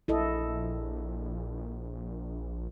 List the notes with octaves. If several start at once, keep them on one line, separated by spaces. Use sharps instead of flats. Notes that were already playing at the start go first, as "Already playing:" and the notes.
A#1 E4 A4 D#5